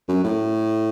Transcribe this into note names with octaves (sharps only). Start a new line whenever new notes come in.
F#2
A2